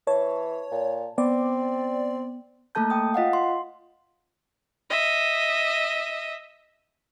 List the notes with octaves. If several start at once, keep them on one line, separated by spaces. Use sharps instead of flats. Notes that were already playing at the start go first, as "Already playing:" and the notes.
E3 C#5 A5
A#2
B3 C4 D5
A3 A#3 A4 A5 G6
G5 D#6
F4 D#5 F5 F#5
C6
D#5 E5